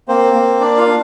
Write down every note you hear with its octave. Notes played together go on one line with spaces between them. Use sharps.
A#3 C4 C5
A#3
D4 D5
F4 F5
D4